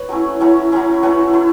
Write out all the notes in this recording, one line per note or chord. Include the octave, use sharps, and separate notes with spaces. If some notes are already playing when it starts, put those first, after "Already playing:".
Already playing: B4 C#5
F#3 A3 C#4 E4
F#3 A3 C#4 E4
F#3 A3 C#4 E4
F#3 A3 C#4 E4 B4
A3 E4